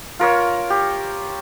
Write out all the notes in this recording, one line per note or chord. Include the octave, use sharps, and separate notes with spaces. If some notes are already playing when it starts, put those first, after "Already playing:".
F4 A#4 C#5 E6
G4